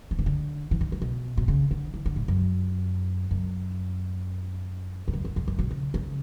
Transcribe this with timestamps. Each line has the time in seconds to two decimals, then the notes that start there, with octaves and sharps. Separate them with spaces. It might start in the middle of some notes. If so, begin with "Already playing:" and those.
0.11 D3
0.19 C#3
0.26 D3
0.71 E3
0.81 D3
0.92 C#3
1.02 B2
1.37 B2
1.48 C#3
1.71 D3
1.94 E3
2.06 D3
2.16 A2
2.28 F#2
3.31 F#2
5.08 E2
5.13 F#2
5.25 F#2
5.36 E2
5.48 F#2
5.59 B2
5.71 C#3
5.94 C#3